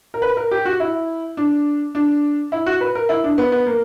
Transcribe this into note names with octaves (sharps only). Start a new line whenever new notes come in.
A#4
B4
A#4
G4
F#4
E4
D4
D4
E4
F#4
B4
A#4
E4
D4
B3
B3
A#3